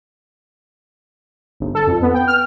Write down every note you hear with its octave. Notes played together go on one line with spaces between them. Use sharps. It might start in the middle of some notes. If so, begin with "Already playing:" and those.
G1
A4
F2
B3
G5
F6